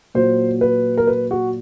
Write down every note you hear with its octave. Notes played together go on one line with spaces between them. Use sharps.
A#2 F#3 C5
B4
A#4
B4
F#4